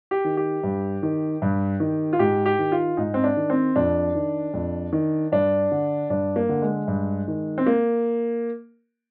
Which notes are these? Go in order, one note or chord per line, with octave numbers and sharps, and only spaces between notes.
G4
D#3
G4
G2
D#3
G2
D#3
F4
G#2 G4
G4
D#3
F4
G#2 D#4
C4
D4
D#3
C4
F2 D4
D#3
F2
D#3
G2 D4
D3
G2 D4
A#3
D3
G#3
G2
D#3
C4
A#3